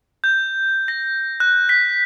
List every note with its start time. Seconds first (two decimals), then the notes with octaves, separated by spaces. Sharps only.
0.24 G6
0.88 A#6
1.40 F#6
1.69 B6